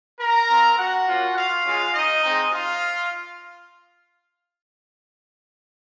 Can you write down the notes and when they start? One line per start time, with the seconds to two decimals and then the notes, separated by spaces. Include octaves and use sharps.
0.20 A#4 A#5
0.49 C4 F4
0.77 F#4 F#5
1.07 A#3 C#4 F4
1.35 F4 F5
1.65 G#3 C#4 F4
1.94 D#4 D#5
2.23 G#3 C4 D#4
2.52 F4 F5